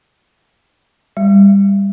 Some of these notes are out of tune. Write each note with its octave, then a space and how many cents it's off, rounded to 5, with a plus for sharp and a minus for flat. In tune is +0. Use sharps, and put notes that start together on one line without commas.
G3 +20